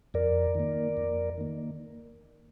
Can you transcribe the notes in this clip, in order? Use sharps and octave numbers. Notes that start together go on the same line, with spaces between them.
F2 A#4 D5
D#3 A#3
F2
D#3 A#3